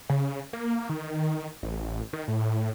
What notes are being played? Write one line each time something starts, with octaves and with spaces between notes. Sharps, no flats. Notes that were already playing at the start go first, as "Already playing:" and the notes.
C#3
A#3
D#3
A1
D#3
A2